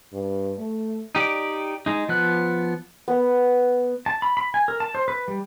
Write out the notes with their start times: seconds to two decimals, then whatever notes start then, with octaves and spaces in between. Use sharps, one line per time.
0.13 G2
0.59 A3
1.15 D#4 G4 D5
1.86 G#3 D#4
2.09 F3 B3 F#6
3.08 B3
4.06 A5
4.22 B5
4.37 B5
4.54 G#5
4.68 A#4
4.80 A5
4.95 C5
5.08 B4
5.28 G3